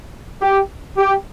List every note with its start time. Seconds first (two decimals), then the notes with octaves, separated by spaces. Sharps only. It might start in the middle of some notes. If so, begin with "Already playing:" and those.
0.42 G4
0.97 G4